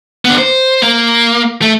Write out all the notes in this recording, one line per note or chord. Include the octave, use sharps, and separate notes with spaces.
D3 B3
C5
A#3
A3